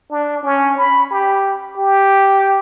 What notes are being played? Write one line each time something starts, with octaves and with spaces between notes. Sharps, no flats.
D4
C#4
B5
G4
G4